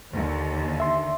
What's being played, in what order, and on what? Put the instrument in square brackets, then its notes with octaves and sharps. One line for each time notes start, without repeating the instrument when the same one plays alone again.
[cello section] D#2 D3
[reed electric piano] E5 C6